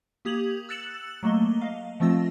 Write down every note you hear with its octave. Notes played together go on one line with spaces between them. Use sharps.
A#3 G4 D#6 G#6 F7 F#7
E6 F#6 A6 C#7 E7 F#7
F#3 A3 A#3 D#5 G7
D#5 F5
F3 A3 C4 F4 E6 A#6